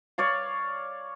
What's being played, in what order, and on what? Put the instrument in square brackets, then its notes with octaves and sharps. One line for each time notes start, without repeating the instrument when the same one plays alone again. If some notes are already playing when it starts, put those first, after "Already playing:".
[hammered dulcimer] C#5 D5 F5